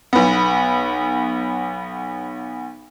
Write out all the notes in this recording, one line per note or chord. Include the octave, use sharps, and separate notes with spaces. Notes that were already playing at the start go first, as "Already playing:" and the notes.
B1 B3